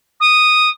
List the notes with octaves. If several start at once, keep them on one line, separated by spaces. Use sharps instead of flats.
D#6